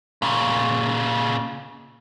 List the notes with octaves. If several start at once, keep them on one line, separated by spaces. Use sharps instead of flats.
A#2 C#3